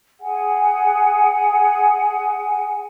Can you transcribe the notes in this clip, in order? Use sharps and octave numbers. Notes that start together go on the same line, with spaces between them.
G#4 F#5 G#5